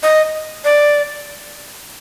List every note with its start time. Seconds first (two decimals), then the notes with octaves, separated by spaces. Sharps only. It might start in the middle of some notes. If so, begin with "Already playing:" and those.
0.03 D#5
0.65 D5